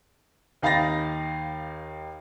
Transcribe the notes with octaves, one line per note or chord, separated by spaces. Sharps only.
D#2 D#4 F5 B5 A6 A#6